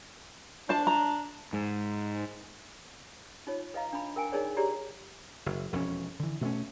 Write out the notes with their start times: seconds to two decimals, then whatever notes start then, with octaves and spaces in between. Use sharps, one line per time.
0.69 D4 C5 A5
0.87 A#5
1.53 G#2
3.47 D#4 F4 C#5
3.74 B4 D#5 F5 A#5
3.93 D4 B5
4.16 A#4 G5 G#5
4.32 D#4 G#4 A#4 C#5 D5
4.57 G4 G#4 C#5 D5 A#5 C6
5.46 F#1
5.72 E1 F2 F#3 C#4
6.19 D3 E3
6.41 B2 A3 C#4